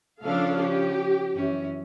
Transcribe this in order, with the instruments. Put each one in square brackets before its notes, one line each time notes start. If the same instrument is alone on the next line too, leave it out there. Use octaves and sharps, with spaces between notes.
[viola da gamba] C#3 F3 C#4 [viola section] D4 A4 F5
[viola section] G4
[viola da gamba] F#2 E3 C#4